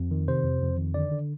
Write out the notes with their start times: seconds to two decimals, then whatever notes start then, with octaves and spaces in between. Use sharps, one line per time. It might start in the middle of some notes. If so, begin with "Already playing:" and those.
Already playing: F2
0.11 D#3
0.28 C3 C5
0.44 F2
0.61 F2
0.78 D#3
0.94 D3 D5
1.12 D3